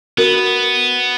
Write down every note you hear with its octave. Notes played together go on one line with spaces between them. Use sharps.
B3 F#4 A#4